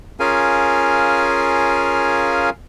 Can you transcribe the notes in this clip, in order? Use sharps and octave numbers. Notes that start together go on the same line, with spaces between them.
C#4 F4 G#4 A#4 F5 G#5